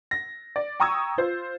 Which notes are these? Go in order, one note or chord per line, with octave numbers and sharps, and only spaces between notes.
A#6
D5
G5 A#5 C#6 D#6 E6 G#6
F4 C5